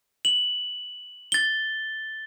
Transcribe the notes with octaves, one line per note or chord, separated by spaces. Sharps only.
F#7
A6 G7